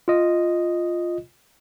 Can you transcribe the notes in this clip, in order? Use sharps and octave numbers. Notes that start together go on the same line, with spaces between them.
F4 D#5